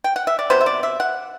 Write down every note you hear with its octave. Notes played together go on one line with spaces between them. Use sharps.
G5
F#5
E5
D5
C3 F#3 B3 C5
E5
D5
E5
F#5